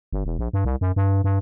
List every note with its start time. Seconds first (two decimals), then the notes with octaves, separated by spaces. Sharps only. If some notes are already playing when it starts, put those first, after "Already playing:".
0.13 G1
0.26 E1
0.39 A#1
0.53 G2
0.65 C2
0.81 F#2
0.96 G2
1.24 G2